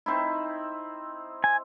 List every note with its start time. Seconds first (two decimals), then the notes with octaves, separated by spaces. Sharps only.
0.06 C4 D#4 E4
1.44 G#5